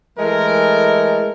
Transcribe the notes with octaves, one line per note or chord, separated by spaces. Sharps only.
E3 G#3 A3 A#4